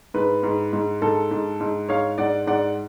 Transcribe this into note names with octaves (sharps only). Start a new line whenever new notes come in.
G#2 B4
G#2
G#2
G#2 A4
G#2
G#2
G#2 C#5 F5
G#2 D5 F#5
G#2 D5 F#5